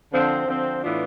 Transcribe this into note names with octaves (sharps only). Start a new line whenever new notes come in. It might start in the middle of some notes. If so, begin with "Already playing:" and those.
D3 F3 C4
D3 F3 C4
A2 E3 B3 D4 F4